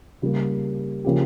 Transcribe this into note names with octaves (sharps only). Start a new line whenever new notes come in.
C#3 G3 A#3
C#3 F3 A#3 C#4 G4